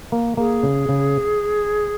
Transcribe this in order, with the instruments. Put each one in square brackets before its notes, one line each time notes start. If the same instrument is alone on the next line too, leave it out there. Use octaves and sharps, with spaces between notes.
[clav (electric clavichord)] A#3
[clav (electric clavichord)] A#3 [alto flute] G#4
[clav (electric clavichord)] C#3
C#3